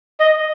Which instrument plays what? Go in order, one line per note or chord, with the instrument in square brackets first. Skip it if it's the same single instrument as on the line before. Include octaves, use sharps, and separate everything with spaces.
[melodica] D#5